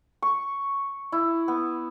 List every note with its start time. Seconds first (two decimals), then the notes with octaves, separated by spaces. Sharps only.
0.22 C#6
1.12 E4
1.48 B3